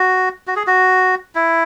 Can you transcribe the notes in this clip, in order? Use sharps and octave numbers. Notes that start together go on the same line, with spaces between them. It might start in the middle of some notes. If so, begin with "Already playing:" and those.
Already playing: F#4
F#4
G#4
F#4
E4